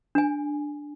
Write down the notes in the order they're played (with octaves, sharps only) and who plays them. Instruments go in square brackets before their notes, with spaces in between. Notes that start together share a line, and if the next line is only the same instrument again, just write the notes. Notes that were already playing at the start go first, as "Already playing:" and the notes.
[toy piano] D4 G#5